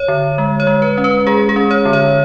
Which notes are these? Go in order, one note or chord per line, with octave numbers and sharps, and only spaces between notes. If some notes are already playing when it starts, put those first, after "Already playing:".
Already playing: C#5
D3
G#3
C#5
G#3
B4
C#4
B4
G#3 G#4
G#4
C#4
C#5
D3
C#5